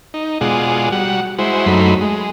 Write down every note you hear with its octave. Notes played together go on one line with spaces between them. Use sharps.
D#4
B2 G#3 F4 G#4 D5 F#5
G3 F#4 F#5
G#3 E4 F#4 C5
F#2 F#3 A3 D#4 B5 C6
G#3